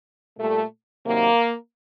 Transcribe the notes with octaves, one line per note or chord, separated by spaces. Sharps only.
A#2 G3 A3
C3 D#3 F#3 A#3